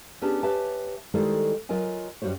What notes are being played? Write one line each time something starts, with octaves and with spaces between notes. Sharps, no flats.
B3 C#4 D4 G4 G#4 A5
G4 B4 C#5 E5 G#5 A5
D#3 G3 G#3 E4 A4 C5
F#3 F4 A#4 D#5 G#5
F#2 G3 F#4 C5 C#5